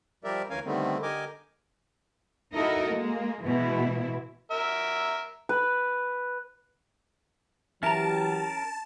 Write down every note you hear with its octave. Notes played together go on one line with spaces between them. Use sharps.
F3 G3 G4 A#4 D5 E5
D2 E3 C#4 A#4 F5 G#5
D3 D#3 G3 A3 B3 C4
D3 G4 A#4 D#5 G#5 D6
D#4 E4 F#4 A4 A#4 D#5
G#3 A#3
B2 E3 G#3 E4
A#4 E5
B4
E3 F#3 C#4 G4 A#4 E5 A5 A#5